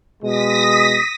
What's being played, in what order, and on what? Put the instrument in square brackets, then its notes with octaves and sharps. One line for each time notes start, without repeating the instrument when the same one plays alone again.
[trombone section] B2 G#3 [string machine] D#6 A#6 B6